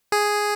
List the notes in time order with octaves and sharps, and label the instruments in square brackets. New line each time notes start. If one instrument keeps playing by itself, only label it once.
[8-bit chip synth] G#4